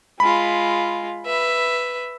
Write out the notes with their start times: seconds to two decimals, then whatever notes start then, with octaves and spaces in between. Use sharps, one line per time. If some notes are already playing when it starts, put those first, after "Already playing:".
0.20 G#3 F4 B5
1.25 B4 E5